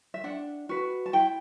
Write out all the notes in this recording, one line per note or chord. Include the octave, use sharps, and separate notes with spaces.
E5
D4 F#5
F#4 B4
A5
E4 G5